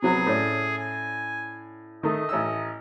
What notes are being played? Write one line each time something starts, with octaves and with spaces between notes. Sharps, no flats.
C3 F#3 B3 G#4
A2 C#4 D5
G#5
D#3 A3 D#5
A1 C#5 E6